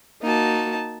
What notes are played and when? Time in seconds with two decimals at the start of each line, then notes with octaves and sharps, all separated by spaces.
0.22 A#3 D#4 F#4 A5